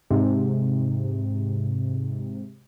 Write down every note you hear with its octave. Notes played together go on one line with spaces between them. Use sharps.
G#2 C3